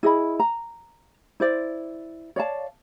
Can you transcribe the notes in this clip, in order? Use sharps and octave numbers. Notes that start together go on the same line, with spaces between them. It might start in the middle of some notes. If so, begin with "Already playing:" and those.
E4 G#4 D#5 B5
A#5
E4 C5 D5
C#5 D5 F5 A5